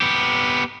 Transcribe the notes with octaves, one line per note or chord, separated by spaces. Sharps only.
B3 G4